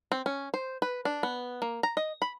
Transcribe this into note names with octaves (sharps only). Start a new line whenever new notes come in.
C4
C#4
C5
B4
D4
B3
A#3
A#5
D#5
B5